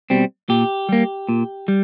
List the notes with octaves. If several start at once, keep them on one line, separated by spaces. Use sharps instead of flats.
B2 G3 C4
A#2 G4
G3 A#3
A#2
G3